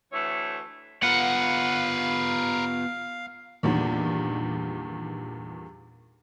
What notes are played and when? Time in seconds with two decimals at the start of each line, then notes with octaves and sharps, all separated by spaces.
0.13 D2 E3 A3 C#5
1.03 B3 F4 A#4 B4 F5 F#5
3.63 E2 G2 A#2 D#3